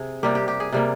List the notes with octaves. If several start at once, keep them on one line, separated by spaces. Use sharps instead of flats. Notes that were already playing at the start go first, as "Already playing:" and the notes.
Already playing: C3 G#4
C3 G3 A#3 G4
G4
G4
G#4
C3 G3 A#3